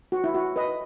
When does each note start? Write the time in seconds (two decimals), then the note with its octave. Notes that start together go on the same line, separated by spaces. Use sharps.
0.12 F#4
0.24 E4
0.35 F#4
0.56 B4 D#5